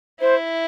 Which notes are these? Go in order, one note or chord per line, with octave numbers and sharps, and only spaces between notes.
E4 C5